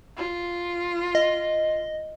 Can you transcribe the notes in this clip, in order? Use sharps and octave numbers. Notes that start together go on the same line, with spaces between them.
F4
D#5